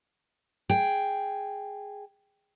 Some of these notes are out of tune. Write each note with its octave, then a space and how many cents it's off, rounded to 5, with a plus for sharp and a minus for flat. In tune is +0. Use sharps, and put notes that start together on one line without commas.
G#4 +0 G5 +0